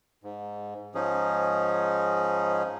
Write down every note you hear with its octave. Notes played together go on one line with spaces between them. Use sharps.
G#2
G#2 F3 C#4 D#4 G#4